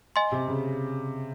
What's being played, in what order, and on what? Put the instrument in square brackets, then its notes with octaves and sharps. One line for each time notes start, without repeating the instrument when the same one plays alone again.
[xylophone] D#5 G#5 C6
[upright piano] C3
C#3